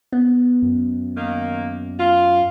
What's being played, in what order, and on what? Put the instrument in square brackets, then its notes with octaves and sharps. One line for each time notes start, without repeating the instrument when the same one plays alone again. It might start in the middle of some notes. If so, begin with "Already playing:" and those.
[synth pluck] B3
[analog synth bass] F#2
[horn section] D#3 A#3
F4